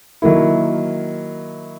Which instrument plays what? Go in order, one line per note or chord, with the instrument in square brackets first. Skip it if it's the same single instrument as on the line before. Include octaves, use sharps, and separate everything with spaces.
[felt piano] D#3 F#3 A#3 E4